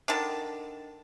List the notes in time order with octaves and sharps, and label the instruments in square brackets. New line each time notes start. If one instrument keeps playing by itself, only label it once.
[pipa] D3 D#3 A5